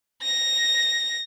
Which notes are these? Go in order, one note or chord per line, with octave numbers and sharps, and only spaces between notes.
A#6